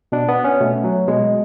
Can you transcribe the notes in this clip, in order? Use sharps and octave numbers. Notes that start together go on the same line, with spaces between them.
B2 D4
B3
C#4
B2 A3
F#3
B2 G#3